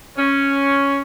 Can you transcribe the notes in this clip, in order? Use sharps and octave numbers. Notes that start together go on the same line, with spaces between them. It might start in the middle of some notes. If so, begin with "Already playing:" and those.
C#4